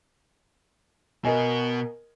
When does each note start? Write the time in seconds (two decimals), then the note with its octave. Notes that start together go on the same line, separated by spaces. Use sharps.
1.25 B2 B3 A#4 D#5 G#5